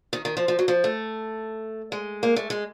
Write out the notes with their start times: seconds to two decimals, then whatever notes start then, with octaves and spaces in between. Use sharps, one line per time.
0.13 D#3
0.25 D#3
0.37 F3
0.48 F3
0.59 F#3
0.68 F3
0.84 A3
1.92 G#3
2.23 A#3
2.36 A3
2.50 G#3